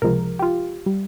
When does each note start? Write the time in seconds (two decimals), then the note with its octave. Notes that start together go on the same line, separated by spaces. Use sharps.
0.02 C#2 C3 F3 G#3 A#4
0.39 G4
0.42 F4
0.86 G3